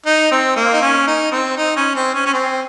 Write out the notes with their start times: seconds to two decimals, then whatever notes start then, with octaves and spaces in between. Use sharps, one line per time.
0.06 D#4
0.32 C4
0.57 A#3
0.73 D#4
0.81 C#4
1.07 D#4
1.31 C4
1.57 D#4
1.76 C#4
1.96 C4
2.15 C#4
2.26 C#4
2.33 C4